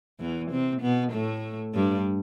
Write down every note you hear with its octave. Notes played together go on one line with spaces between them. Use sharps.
E2 E3
C3 C4
B2 B3
A2 A3
G2 G3